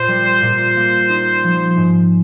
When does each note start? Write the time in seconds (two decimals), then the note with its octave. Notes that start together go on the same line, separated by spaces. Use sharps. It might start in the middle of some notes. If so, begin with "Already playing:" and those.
Already playing: A#2 C5
0.08 G3
0.42 A#2
0.76 A#3
1.09 D#4
1.44 F3
1.77 G#2